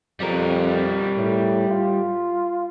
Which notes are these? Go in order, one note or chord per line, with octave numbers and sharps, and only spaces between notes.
F2 G3 A#4
A2
F4